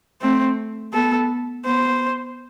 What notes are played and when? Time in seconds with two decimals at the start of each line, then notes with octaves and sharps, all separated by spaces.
0.21 A3 C4
0.93 B3 A4
1.65 B3 C5